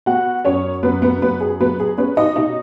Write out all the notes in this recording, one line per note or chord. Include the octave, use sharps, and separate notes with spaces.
B3 F#4 F#5
F#2 C#4 C#5
F#2 B3 B4
B3 B4
F#2 B3 B4
G#4
F#3 B3 B4
G#4
B3 C#4 B4
D#4 D#5
B2 D#4 D#5